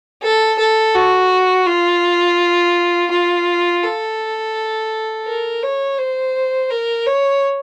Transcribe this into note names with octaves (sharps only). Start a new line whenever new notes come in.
A4
A4
F#4
F4
F4
A4
A#4
C#5
C5
A#4
C#5